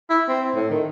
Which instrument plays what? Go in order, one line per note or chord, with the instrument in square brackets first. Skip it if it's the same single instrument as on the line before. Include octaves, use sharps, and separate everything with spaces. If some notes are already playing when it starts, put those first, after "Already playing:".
[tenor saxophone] E4
C4
A2
D#3